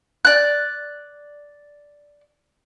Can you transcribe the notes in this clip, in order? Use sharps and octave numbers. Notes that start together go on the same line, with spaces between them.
D5 F#6